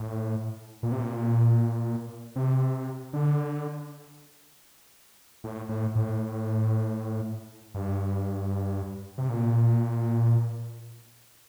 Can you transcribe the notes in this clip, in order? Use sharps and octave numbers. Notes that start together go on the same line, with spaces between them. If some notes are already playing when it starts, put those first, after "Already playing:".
Already playing: A2
A#2
C3
A#2
C3
D3
A2
A2
A2
G2
C3
A#2